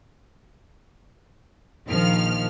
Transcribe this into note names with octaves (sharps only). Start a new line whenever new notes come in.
A#1 D#3 F3 F6